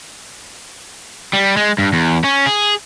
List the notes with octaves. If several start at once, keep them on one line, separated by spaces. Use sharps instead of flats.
G3
G#3
G2
E2
C#4
G#4